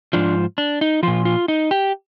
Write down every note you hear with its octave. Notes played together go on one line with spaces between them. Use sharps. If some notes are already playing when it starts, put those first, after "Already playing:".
G#2 F3 D4
D4
D#4
A#2 F3 F4
F4
D#4
G4